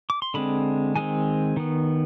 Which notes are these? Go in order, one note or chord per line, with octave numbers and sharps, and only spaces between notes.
D6
C6
D3 G#3 C4 B5
D#3 G#3 C4 G#5
D#3 B3